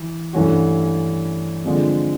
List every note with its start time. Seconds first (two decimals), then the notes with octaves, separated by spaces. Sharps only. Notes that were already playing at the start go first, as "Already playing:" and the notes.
Already playing: E3
0.33 G2 E3 A3 C#4 F#4
1.65 D3 F3 G#3 C4